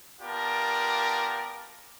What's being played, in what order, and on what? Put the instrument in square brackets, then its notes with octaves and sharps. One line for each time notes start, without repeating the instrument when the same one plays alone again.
[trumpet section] B3 F4 G4 A#4 D5 A5